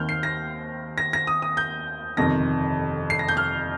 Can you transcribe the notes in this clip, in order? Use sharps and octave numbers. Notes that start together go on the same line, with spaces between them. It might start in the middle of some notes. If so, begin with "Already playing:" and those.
Already playing: D#2 D#3 C4 F6 G6
C7
A#6
A#6
A#6
D#6
D#6
G6
G1 F2 C3 D#3 A#6
C7
A#6
G6
F6